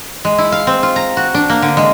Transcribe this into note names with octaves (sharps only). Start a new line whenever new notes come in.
G#3
E4
F5
C4
F4
A#5
F#4
D4
A#3
D3
G#3